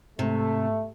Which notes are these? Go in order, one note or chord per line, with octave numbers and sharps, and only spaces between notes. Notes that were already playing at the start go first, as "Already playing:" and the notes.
G#2 C3 A3